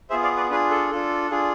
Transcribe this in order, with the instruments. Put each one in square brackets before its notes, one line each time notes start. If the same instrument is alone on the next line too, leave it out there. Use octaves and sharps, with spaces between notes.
[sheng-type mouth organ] B3 F4 G#4 C5 E5
D5 F5
B4 D5
D4 F4 G#4 B4
A4
D4 F4 A4
D4 F4 G#4